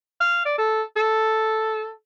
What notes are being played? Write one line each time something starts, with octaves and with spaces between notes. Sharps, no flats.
F5
D5
A4
A4